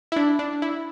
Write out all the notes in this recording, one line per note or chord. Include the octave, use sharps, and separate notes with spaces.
E4
D4
D4
E4